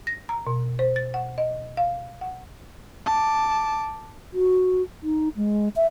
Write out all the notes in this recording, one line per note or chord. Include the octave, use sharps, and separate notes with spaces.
A#6
A#5
B2
C5
A6
F#5
D#5
F5
F#5
A5 D6
F#4
D#4
G#3
E5